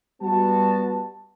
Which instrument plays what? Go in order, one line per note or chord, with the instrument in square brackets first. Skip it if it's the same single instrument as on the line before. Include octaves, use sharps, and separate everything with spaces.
[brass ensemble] G3 B3 F#4 A5